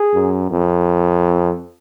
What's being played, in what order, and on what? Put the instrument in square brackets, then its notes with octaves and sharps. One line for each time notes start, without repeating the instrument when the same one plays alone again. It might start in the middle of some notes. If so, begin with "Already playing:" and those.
Already playing: [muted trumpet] G#4
[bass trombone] F#2
F2